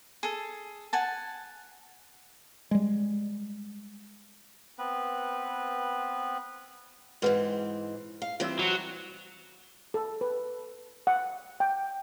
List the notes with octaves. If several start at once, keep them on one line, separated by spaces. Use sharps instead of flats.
G#4 A4
F#5 G#5 A5
G3 G#3
B3 C4 B4
G#2 E3 C4 F#4 B4 F#5
F5
E3 G3 C4 F4 D5 E6
F#3 B5
A4
B4
F#5
G5